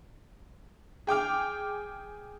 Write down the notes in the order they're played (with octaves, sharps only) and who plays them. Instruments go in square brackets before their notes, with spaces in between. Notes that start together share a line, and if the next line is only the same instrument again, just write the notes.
[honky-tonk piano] G#4 G5 D6 F6